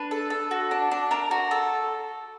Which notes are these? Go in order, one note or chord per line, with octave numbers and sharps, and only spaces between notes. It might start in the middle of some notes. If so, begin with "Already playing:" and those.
Already playing: D4 B4
A4
A4
F#4
D4
D4
D4 A#4
F#4
A4